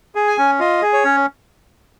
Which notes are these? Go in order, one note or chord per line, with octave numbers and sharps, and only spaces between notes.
G#4
G#5
C#4
F4 D#5
G#4
C#5
C#4